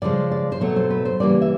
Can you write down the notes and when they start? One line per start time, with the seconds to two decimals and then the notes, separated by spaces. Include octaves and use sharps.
0.02 C#3 F3 G#3 D5
0.31 D5
0.52 C5
0.61 B2 F#3 A3 C#5
0.76 C5
0.90 B4
1.05 C5
1.20 C#3 E3 G3 A#3 D5
1.42 E5